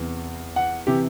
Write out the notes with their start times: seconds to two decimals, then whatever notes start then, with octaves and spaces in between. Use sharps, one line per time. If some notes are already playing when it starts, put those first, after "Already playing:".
Already playing: E2 C3 E3
0.56 F#5
0.87 C3 E3 G4